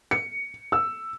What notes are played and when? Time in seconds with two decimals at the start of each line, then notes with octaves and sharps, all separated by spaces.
0.11 C#7
0.72 E6